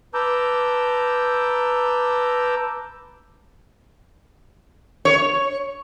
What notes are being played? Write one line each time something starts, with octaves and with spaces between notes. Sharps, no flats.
B4 A5 A#5 D6 E6 G6
C#5